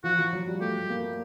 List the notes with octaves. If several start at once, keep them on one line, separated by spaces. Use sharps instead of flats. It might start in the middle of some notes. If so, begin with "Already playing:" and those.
F3 F#4
F3
F#3
G3
A3 G4
A#3